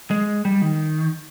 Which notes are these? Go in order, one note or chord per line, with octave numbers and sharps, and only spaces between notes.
G#3
G3
D#3